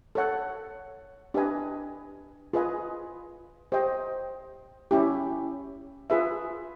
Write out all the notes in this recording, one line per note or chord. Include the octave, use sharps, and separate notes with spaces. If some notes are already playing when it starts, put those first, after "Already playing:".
A4 C#5 F#5
D4 G4 B4 D#5 G#5
F4 G#4 B4 D#5 G#5
G4 C5 D#5 G5
C#4 E4 G4
F4 G#4 B4 E5